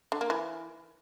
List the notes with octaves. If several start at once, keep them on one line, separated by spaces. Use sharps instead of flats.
D3
A#3
E3